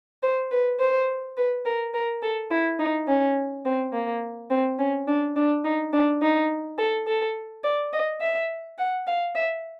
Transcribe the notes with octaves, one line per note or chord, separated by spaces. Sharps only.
C5
B4
C5
B4
A#4
A#4
A4
E4
D#4
C#4
C4
A#3
C4
C#4
D4
D4
D#4
D4
D#4
A4
A4
D5
D#5
E5
F#5
F5
E5